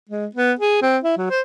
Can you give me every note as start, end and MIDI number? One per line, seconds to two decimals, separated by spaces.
0.09 0.26 56
0.35 0.53 59
0.59 0.81 68
0.82 0.98 60
1.04 1.15 64
1.17 1.27 54
1.30 1.41 72